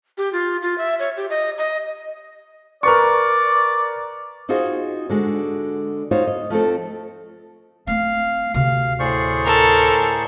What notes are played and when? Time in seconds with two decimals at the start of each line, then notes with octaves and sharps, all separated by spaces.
0.18 G4
0.33 F4
0.62 F4
0.78 E5
1.00 C#5
1.17 G4
1.30 D#5
1.58 D#5
2.83 A#4 B4 D5 C#6
4.49 D#4 F4 F#4 G#4 C5 D#5
5.10 D3 G#3 F#4
6.11 D#4 F4 F#4 C5 C#5
6.27 D#5
6.50 F3 A3 C4 A4
7.87 A3 C4 F5
8.54 D2 C3 F5
9.00 A2 G#4 C5 D5 C#6
9.45 A4 A#4